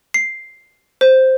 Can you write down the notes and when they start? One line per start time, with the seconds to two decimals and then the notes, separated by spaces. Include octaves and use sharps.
0.14 C7
1.01 C5